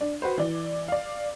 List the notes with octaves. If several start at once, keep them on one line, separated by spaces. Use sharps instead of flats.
D4
F#4 B4 C5
E3 D5
D5 F5